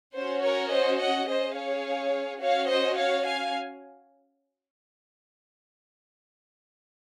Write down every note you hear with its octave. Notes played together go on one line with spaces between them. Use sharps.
C#4 F#4 C5
A#4 C#5
C5 D#5
D#5 F#5
C#4 G#4 C5 D#5
C#5 F5
C#4 F#4 C#5 F5
C5 D#5
C#5 F5
F5 G#5